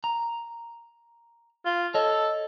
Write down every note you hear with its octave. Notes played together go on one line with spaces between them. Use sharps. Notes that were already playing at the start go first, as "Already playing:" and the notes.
A#5
F4
A4 C#5 D#5